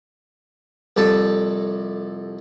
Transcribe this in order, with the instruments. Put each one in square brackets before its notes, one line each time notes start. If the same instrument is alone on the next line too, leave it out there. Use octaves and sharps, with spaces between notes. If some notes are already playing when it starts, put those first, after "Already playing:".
[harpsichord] C2 F2 A4 A5